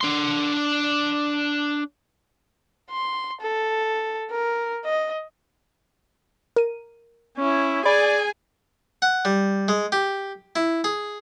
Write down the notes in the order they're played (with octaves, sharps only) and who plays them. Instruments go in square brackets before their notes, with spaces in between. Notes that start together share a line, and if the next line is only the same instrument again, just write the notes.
[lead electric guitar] D4 C6
[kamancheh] C6
A4
A#4
D#5
[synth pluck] A#4 D#7
[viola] C#4 E4
[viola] G#4 G#5 [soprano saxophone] D5 [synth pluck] B5
[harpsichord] F#5
G3
G#3
G4
E4
G#4